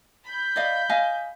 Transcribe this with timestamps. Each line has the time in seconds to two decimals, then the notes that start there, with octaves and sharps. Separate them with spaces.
0.24 B5 G6
0.56 D5 D#5 F5
0.89 D#5 F5 G#5